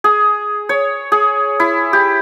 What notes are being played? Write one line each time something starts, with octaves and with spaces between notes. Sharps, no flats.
G#4
C#5
G#4
E4
G4